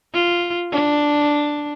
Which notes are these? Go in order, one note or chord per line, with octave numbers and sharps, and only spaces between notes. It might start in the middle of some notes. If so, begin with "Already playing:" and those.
F4
D4